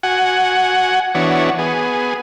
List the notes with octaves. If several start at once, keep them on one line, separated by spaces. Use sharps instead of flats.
F#4 F#5 G#5
E3 B3 D4 F#4 C#5
B3 G#4